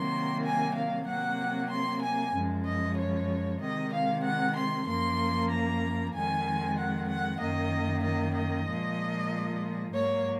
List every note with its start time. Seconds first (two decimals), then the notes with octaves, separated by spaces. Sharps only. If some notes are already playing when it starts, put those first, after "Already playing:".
Already playing: C3 D#3 F#3 A#3 C6
0.44 G#5
0.76 F5
1.07 C3 F#3 A#3 F#5
1.70 C6
2.02 G#5
2.34 F#2 F3 G#3
2.66 D#5
2.97 C#5
3.61 C3 D#3 G#3 D#5
3.93 F5
4.24 F#5
4.56 C6
4.87 F#2 F3 A#3 C6
5.51 A#5
6.14 F2 D#3 G#3 G#5
6.77 F#5
7.08 F#5
7.41 F#2 D#3 A#3 D#5
8.04 D#5
8.35 D#5
8.67 A#2 F3 G#3
9.93 G#2 F#3 A#3 C#5